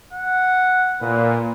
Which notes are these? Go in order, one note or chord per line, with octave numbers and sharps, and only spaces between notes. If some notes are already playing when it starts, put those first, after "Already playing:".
F#5
A#2 B4